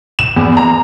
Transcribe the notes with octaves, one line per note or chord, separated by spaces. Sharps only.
E7
E2
A#5